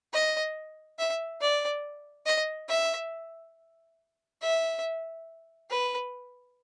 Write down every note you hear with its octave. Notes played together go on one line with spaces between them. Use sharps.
D#5
E5
D5
D#5
E5
E5
B4